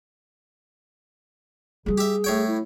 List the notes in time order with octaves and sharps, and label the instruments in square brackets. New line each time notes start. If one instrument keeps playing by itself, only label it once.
[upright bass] G3 F4 [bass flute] G#4
[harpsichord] G4 E5
A2 C#5 G5
[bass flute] E4